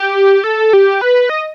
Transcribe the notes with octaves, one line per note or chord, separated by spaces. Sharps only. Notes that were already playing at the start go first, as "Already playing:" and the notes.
Already playing: G4
A4
G4
B4
D#5